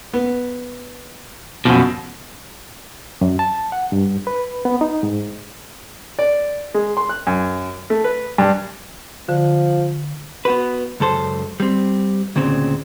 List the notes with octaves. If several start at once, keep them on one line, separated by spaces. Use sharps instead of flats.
B3
F#2 B2 F3
F#2
A5
F#5
G2
B4
B3
D#4
G#2
D5
G#3
C6
F#6
F#2
A3
B4
G2
D3 F3
B3 F#4 B4
C#2 F#2 A4 C5
G3 C4
D2 A#2 C#3 C4